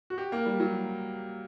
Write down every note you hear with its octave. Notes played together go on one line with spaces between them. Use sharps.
F#4
G4
A#3
G3
F#3